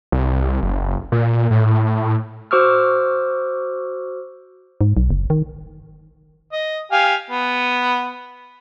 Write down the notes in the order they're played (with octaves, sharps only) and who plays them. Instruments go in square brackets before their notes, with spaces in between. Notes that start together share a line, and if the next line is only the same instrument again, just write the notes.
[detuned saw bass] C2
F#1
A#2
A2
[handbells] F#4 C5 C#6 D6 E6 F6
[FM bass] G#2
B1
F#1
D#3
[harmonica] D#5
G4 F5 G#5
B3